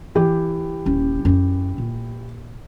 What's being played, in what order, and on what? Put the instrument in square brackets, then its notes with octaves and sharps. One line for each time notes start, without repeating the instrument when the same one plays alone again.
[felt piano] E3 G4
[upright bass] D#1 C#4
F#2 C#4
A#2